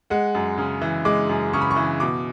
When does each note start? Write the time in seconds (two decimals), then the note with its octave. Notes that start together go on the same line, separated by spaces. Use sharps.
0.10 G#3 F#5
0.35 F#2
0.58 C#3
0.82 E3
1.05 G#3 D6
1.29 F#2
1.53 C#3 C#6
1.61 B5
1.71 C#6
1.76 E3
2.00 B2 D6